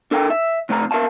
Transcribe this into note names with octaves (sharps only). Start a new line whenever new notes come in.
D4 A4 A#4 F#5 G5
E5
C3 A3 C4 D#5 A#5
A#4 E5 F5 A5